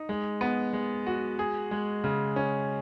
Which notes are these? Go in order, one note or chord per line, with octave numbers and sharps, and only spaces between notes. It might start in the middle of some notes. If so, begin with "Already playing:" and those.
Already playing: D#4
G#3
B3
G#3
F#4
G#4
G#3
C#3
C#4